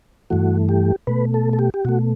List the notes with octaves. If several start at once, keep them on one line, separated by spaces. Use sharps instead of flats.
G2 E3 A3 F#4
G4
B2 A3 B4
A4
A4
G4
G4
B2 A3 F#4